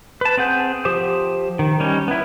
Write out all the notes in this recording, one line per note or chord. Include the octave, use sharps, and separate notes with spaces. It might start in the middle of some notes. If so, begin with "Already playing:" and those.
B4 A5
C4 G#4 F#5 G6
F3 G4 C5 D6 D#6
D#3
G3 C#4 D#4
B3 E4